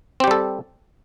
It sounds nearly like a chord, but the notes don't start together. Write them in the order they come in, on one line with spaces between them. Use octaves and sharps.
C4 G4 G3 A4